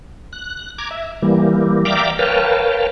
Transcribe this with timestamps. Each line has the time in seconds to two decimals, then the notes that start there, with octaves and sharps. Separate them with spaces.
0.33 F#6
0.78 A#5 D6 G#6
0.91 E5
1.22 E3 G3 A#3
1.85 D5 E5 F5 G5 A#5 D6
2.19 A#4 B4 C#5 F5 G5 A5